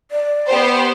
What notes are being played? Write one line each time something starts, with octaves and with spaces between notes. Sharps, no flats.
D5
B3 G4 C5